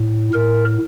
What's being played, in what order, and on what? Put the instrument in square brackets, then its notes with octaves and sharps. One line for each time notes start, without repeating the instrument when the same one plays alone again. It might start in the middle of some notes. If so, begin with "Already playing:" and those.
Already playing: [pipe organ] A2
A2 A#4